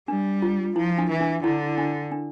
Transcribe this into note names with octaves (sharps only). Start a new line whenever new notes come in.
G3 D4
F4
F3 E4
D4
E3
D4
D3 E4
D4
D4